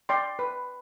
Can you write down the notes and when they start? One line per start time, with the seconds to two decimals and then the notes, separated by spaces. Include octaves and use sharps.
0.09 D5 G5 C6
0.39 B4